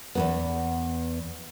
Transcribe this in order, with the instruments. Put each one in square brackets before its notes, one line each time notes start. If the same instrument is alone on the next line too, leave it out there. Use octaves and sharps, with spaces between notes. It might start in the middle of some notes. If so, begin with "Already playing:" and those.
[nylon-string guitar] E2 G#2 B3